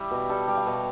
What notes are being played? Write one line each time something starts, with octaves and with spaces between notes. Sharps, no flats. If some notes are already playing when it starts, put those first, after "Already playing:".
Already playing: G3 E4 G4
B2
G3 A4
G3
F5
B2